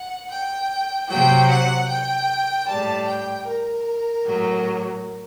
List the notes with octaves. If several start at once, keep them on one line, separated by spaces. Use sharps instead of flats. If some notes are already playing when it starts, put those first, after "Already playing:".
Already playing: F#5
G5
C3 F#3 G5
F#5
G5
A2 G3 A5
G5
A#4
A2 F#3